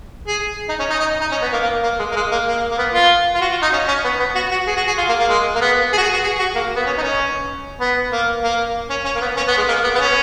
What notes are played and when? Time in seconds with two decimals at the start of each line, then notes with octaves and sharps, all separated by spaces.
0.27 G#4
0.69 D#4
0.79 C#4
0.90 D#4
1.00 D#4
1.21 D#4
1.32 C#4
1.42 B3
1.52 A#3
1.63 A#3
1.84 A#3
1.99 G#3
2.12 A#3
2.16 G#3
2.31 A#3
2.47 A#3
2.71 A#3
2.78 B3
2.94 F4
3.35 F4
3.41 F#4
3.52 F4
3.62 D#4
3.73 C#4
3.88 C#4
4.04 B3
4.20 B3
4.35 F#4
4.51 F#4
4.67 G#4
4.77 F#4
4.87 G#4
4.98 F4
5.09 A#3
5.19 A#3
5.29 G#3
5.55 A#3
5.61 B3
5.93 G#4
5.98 F#4
6.03 G#4
6.13 F#4
6.24 G#4
6.39 F#4
6.55 A#3
6.76 B3
6.86 C#4
6.98 D#4
7.02 C#4
7.80 B3
8.12 A#3
8.44 A#3
8.90 C#4
9.05 C#4
9.15 A#3
9.21 B3
9.37 C#4
9.48 B3
9.57 G#3
9.68 A#3
9.84 B3
9.95 B3
10.00 C#4